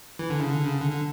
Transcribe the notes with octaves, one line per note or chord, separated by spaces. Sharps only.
E3
D3
C#3
D3
C#3
D3
D3